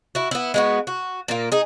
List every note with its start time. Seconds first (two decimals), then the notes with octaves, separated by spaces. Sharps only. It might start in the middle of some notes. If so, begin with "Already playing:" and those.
0.15 E4 F#4
0.31 B3 E4
0.54 G#3 B3 F#4
0.87 F#4
1.28 A#2 A#3
1.52 D#4 G#4